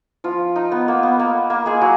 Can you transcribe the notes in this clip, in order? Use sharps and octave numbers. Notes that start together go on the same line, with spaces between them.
F3 F4
D#4
B3
A#3
B3
A#3
A#3
G#3 G#4
F#3